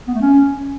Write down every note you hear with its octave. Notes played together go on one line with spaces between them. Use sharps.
B3
A3
C#4